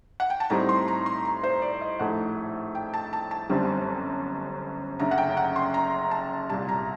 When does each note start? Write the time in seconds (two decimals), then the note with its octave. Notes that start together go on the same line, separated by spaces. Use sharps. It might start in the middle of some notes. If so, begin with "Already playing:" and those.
0.20 F#5
0.30 G5
0.40 A5
0.50 A2 G3 C4 D#4 A#5
0.69 C6
0.88 A#5
1.06 C6
1.25 A#5
1.44 C5
1.62 D5
1.81 D#5
1.99 A#1 A2 A3 D#4 F#5
2.75 G5
2.94 A5
3.13 A5
3.31 A5
3.49 G1 F#2 D3 G3 C4
4.99 F#1 F#2 D3 A#5
5.11 F#5
5.18 G5
5.37 F#5
5.56 C6
5.74 A#5
6.11 A5
6.50 C2 A#2 G3 A5
6.69 A#5